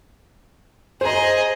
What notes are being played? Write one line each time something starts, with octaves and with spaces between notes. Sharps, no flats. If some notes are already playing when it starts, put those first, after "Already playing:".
G#4 C5 D#5 A#5